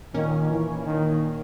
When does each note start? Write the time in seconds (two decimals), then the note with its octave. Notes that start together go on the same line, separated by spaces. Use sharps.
0.14 A#2 D#3 A#3 C#4
0.50 E3
0.86 D#3